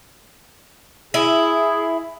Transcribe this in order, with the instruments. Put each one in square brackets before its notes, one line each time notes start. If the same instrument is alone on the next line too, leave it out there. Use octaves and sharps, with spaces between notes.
[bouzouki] E4 [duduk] G#4